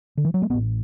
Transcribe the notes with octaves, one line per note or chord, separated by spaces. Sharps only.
D3
E3
F#3
A3
A1 A2 B3